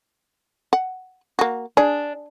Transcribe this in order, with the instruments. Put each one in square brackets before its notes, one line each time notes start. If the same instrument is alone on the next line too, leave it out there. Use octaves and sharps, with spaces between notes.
[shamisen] F#5
A#3 F#4
[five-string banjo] D4 [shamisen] G#4